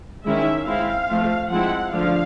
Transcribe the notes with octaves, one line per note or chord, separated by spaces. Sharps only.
D#3 G#3 C#4 E4 E5
G#3 C4 E4 F5
F3 A3 C4 F4
F3 G#3 C4 E4 F#5
D3 F3 A3 D4 F5